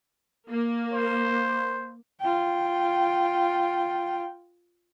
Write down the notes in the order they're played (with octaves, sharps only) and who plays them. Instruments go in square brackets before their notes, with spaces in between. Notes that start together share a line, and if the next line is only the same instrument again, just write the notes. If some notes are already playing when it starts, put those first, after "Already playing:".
[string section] A#3
[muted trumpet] C5
[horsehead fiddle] F4 G5